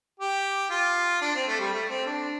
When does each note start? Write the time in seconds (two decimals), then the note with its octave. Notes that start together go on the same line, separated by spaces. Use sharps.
0.20 G4
0.70 F4
1.21 D4
1.35 C4
1.47 A3
1.60 G3
1.74 A3
1.90 C4
2.07 D4